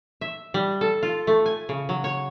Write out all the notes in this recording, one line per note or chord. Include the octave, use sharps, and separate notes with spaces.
E5
G3
A4
F4
A3
G#5
C#3
F#3
C#5